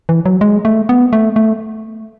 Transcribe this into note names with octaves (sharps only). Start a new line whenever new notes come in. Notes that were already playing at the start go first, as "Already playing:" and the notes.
E3
F#3
G#3
A3
B3
A3
A3